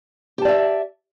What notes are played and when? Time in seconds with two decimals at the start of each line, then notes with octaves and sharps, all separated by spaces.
0.38 G4
0.42 A5
0.45 D5
0.48 E5